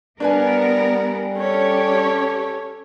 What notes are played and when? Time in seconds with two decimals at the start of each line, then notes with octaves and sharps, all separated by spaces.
0.20 G3 B3 D4 A#4 B4 G#5
1.37 C#4 G4 A4 C#5